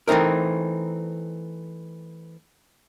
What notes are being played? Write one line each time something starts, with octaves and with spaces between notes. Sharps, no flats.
E3 A3 C4 D#4 A#4